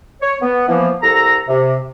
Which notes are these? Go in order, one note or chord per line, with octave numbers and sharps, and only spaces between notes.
C#5
B3
E3 F3 A#3 B3
C2 A4 A#5
C3